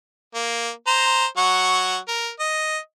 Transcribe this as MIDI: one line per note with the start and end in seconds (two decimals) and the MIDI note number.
0.34 0.69 58
0.87 1.26 72
0.87 1.26 82
1.37 1.98 54
1.37 1.98 78
1.37 1.98 85
2.08 2.30 70
2.40 2.78 75